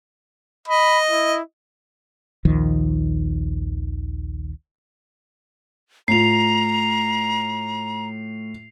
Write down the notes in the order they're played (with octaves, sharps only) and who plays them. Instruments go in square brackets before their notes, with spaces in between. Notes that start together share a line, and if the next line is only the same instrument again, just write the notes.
[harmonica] D#5 [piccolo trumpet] B5
[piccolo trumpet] E4
[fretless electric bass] A#1 D#2 D#3 F3
[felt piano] A2 F4 [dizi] A#5 [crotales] C7 F7